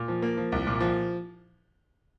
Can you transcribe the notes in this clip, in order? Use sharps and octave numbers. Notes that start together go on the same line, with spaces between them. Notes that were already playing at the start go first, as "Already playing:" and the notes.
Already playing: A#2
F3
A#3
F3
C2
A#2
F3